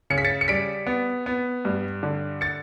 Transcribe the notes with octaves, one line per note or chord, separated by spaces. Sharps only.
C#3 C#7
B6
A6 C#7
C#7
G3 B6 D7
B3
B3
G2
D3
A6 C#7